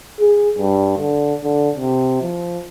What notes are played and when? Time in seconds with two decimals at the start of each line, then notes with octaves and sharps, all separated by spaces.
0.20 G#4
0.58 G2
0.98 D3
1.44 D3
1.75 C3
2.22 F3